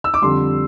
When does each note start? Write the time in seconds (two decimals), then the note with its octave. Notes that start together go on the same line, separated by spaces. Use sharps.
0.04 E6
0.14 D6
0.22 F2 D3 G3 C6